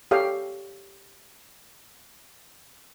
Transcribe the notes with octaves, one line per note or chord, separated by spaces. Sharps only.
G4 A4 C#5 F5 G5